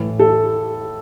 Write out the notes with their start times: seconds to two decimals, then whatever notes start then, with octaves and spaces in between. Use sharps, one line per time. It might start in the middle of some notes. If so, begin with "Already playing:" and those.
Already playing: A2 E3
0.19 A4